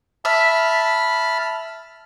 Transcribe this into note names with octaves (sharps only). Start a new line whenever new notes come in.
E5 A5 B5 F6